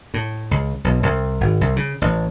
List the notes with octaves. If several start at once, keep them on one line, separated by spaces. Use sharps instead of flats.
A2
C#2
B1
C2
G#1
C2
C#3
A1